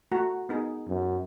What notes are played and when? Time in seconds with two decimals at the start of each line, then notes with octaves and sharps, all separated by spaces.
0.12 A3 F#4 A#5
0.49 B3 D#4 G#4
0.87 F#2